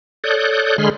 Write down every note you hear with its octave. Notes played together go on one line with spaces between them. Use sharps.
A4 C#5 D5 D#6 F#6 G6
D3 G#3 G#4 B5 C6 F6